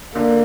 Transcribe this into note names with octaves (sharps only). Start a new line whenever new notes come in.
D3 A#3